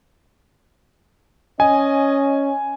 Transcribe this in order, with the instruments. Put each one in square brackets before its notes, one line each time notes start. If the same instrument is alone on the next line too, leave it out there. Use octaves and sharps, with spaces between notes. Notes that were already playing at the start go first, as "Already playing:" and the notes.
[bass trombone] C#4 [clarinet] D#5 [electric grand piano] G#5